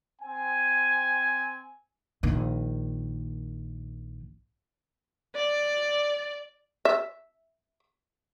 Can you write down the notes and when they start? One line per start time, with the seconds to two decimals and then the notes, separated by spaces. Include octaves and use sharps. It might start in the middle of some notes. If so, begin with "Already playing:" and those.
0.22 C4 G#5
2.23 A#1 D#3
5.35 D5
6.85 E5